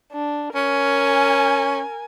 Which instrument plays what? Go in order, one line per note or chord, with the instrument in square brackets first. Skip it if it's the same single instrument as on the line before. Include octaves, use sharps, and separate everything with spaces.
[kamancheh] D4
[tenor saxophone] C#4 [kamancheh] A#4 G#5